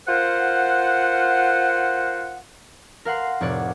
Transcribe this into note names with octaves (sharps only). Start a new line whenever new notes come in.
F4 A#4 C5 F#5
A#4 F5 F#5 C6
F1 A2 C#5 D5 F#5